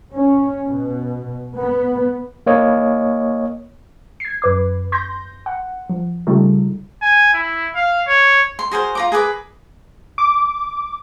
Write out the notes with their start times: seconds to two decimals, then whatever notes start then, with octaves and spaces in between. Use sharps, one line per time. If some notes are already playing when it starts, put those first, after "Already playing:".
0.13 C#4
0.67 B2
1.57 B3
2.46 A#3 C#5 D#5
4.20 G#6 C7
4.42 F#2 B4 D6
4.92 C6 G6 A#6
5.46 F#5
5.89 F3
6.27 C#3 G3 A3 D#4 F4 A4
7.02 G#5
7.33 E4
7.75 F5
8.07 C#5
8.59 C6
8.71 F#4 G#4 A#4 C5
8.95 F4 A#5 D6
9.12 G#4 A#4 B4 D6
10.18 D6